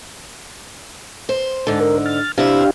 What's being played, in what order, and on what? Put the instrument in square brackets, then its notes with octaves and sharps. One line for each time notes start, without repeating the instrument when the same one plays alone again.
[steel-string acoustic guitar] C5
[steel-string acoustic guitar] G#2 D3 [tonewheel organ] A5
[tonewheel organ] A#4
F6 A6
[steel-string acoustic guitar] C3 E4 F4 [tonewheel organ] D4 G4 F5